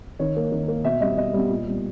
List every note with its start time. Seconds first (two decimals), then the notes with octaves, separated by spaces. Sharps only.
0.19 D#3 C#5
0.36 A#3
0.52 D#3
0.68 A#3
0.84 B2 E5
1.01 G3 B3 D#5
1.17 B2 D#5
1.33 G3 B3
1.50 A#2
1.67 G3 B3